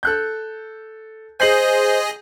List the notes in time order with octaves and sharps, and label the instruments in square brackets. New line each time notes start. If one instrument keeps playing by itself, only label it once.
[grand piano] A4 F#6 G6
[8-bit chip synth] G#4 D#5 G#5 [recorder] C5 [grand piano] G6 C7 F#7